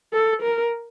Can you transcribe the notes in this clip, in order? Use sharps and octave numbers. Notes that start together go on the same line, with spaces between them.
A4
A#4